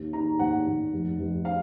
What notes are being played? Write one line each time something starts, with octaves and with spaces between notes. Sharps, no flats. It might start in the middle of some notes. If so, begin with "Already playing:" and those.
Already playing: D#2
D#3 A#5
D#2 F#5
D#2
F1
F1
F5